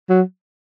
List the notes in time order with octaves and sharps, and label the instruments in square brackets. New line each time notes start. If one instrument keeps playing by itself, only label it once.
[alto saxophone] F#3